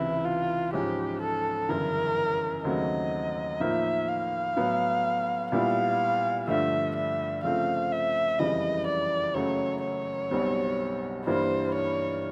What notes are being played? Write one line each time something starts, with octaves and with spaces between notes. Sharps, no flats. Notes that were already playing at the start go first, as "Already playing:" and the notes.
Already playing: C#2 C3 E3 E4
F4
G#2 F3 G#3 C#4 G4
A4
G1 F#2 C#3 E3 A#4
D#2 C#3 F#3 A3 C4 D#5
A2 F3 A#3 D#4 E5
F5
A2 F#3 B3
A#2 G3 B3 E4 F5
G2 D3 F3 A3 E5
E5
C#3 F3 A3 C4 F5
E5
F#1 F2 C#3 E3 G3 D#5
D5
F#1 F#2 C#3 F#3 A3 C#5
C#5
B1 B2 G3 C4
G2 E3 G3 A#3 C5
C#5